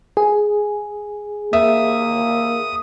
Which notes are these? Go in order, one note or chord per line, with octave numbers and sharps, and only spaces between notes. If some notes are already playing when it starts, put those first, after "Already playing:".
G#4
A#3 E5 D#6